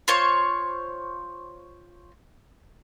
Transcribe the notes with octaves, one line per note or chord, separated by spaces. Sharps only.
F4 C5 C#5